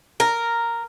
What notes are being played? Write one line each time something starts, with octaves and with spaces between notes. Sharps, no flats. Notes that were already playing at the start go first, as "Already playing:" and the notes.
A#4